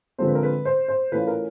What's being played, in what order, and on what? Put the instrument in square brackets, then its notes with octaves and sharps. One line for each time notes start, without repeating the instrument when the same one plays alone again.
[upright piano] D3 F3 G#3 C4 C5
B4
A#4
B4
C5
C5
E3 A3 C#4 F4 B4
A#4